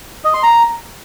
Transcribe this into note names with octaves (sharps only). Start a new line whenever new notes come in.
D#5
C6
A#5